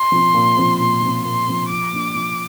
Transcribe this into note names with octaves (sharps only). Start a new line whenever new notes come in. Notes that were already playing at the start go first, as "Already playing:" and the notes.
Already playing: C6
F3 C4
A#2
F3 C4
A#2 C6
F3 C4
A#2 C6
F3 C4
F3 D6
A#3 D4
F3